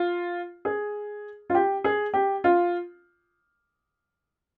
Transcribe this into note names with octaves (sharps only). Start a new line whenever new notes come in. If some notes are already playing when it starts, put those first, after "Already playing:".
Already playing: F4
G#4
F4
G4
G#4
G4
F4